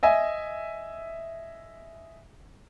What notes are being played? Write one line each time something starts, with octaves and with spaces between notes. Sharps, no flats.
D#5 E5 G#5